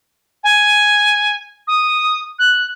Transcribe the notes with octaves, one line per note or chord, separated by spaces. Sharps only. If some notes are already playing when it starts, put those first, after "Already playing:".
G#5
D#6
F#6